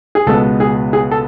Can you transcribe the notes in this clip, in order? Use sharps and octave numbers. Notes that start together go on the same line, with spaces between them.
G#4
C#2 B2 G#3 B3 A4
G#4
G#4
A4